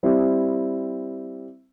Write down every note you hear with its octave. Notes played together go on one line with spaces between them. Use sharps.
G3 C4 E4